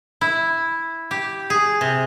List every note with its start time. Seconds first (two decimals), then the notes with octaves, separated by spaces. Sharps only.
0.21 E4
1.11 G4
1.50 G#4
1.81 C3